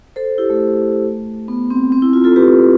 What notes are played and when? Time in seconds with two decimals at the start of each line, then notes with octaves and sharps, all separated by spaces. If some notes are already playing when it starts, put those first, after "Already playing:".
0.16 A4 C5
0.38 E4 G4
0.50 A3
1.48 B3
1.70 C4
1.92 C4
2.02 E4
2.13 F4
2.24 F4 A4
2.36 G4 B4